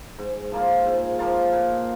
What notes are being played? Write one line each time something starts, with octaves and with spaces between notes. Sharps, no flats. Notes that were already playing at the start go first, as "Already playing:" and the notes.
G#2
F3 A#3 F4
G#2
F3 A#3 F4
A#2